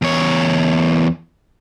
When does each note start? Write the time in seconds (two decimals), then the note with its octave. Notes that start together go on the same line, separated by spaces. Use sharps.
0.02 E2 C#5